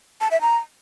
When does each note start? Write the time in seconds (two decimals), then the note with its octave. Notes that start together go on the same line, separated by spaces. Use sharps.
0.21 A5
0.31 E5
0.41 A#5